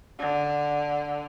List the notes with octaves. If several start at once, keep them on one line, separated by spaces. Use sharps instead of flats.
D3